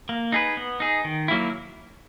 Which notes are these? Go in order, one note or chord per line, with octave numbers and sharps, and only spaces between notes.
A#3
D#4 G#4 B4
B3
D#4 G#4
D#3
F#3 A#3 E4